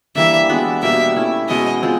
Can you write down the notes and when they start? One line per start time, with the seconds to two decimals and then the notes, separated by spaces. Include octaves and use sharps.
0.15 E3 G3 A#3 D4 E5
0.49 G#3 B3 D4 F#4
0.82 B2 G3 A#3 E5
1.16 A3 C#4 E4
1.49 B2 G#3 C#4 D#5
1.82 G#3 C4 F4